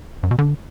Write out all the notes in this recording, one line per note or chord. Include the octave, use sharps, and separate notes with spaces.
F#2
B2
D3